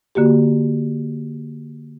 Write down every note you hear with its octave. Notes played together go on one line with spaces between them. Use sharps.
D3 A#3 F#4 G4